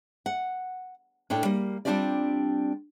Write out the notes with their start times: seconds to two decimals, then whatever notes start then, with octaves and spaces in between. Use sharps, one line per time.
0.26 F#5
1.30 A2 D4 A4 G5
1.45 G3 A#3
1.85 G3 C4 D4 F4 G4 D5